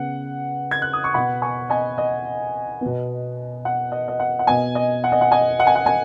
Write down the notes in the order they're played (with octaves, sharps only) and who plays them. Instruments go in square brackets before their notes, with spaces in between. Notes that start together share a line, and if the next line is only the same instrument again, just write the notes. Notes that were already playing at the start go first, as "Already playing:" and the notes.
Already playing: [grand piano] C#3 B3 F#5
G#6
F#6
D#6
C#6
B2 B3 F#5 B5
G#5 C#6
D#5 G#5
D#5
B2 B3
F#5
D#5
D#5
F#5
F#5
B2 B3 D#5 G#5
D#5
F#5
D#5
F#5
D#5 G#5
F#5
G#5
F#5
D#5 G#5